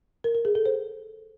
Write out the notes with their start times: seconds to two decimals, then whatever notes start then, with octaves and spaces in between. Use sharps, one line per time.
0.24 A#4
0.35 A#4
0.45 G#4
0.55 A4
0.66 C5